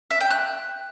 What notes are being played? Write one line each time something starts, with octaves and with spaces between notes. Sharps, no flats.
E5
G5
F#6